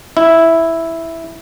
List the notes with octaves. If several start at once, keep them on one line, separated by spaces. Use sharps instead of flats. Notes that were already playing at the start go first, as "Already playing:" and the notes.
E4